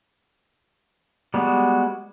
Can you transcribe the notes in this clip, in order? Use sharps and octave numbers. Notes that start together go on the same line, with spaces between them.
G3 G#3 B3 F#4